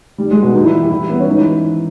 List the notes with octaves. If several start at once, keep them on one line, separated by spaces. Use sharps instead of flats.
G2 D#3 G3
G#3
B2 B3
A#2 D#3 D#4
E3 E4
G3 G4
G2 E3 E4
B3
C#4
G#2 D#3 D#4
E3 E4